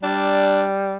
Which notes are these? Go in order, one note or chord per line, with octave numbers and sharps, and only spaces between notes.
G3 D4